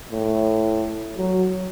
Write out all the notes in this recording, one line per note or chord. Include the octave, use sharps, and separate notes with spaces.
A2
F#3